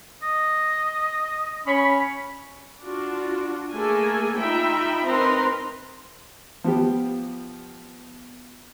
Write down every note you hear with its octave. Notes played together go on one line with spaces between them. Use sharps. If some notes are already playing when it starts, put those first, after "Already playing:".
D#5
C#4 C#5 B5
D4 F4 F#4
A3 A#3 G#4 A4 G#5
D#4 F4 E5 G5 B5
C4 D#4 A#4 B4 A#5 C6
F3 B3 G4